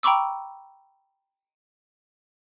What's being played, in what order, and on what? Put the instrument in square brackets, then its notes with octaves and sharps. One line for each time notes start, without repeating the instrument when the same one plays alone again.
[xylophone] G5 A#5 B5 C#6 D6 E6